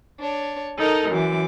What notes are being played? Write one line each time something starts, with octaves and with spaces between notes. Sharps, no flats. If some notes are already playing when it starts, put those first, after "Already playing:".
D4 C#5
D#4 A4 A#4 D#5
F#2 E3 D6